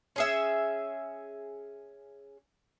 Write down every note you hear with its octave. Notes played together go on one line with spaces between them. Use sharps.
C#4 G#4 E5